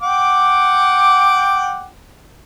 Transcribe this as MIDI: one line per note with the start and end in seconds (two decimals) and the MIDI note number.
0.02 1.85 78
0.02 1.85 79
0.02 1.85 86